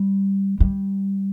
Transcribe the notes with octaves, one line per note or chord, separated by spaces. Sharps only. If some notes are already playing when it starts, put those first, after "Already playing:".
Already playing: G3
G3